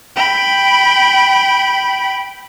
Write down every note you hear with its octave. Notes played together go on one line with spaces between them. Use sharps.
G5 B5